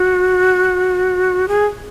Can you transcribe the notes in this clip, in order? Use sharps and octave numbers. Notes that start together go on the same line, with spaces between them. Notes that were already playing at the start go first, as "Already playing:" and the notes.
Already playing: F#4
G#4